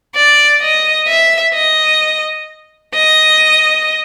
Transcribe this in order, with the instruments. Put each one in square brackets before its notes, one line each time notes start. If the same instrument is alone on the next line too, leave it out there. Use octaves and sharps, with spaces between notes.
[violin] D5
D#5
E5
D#5
D#5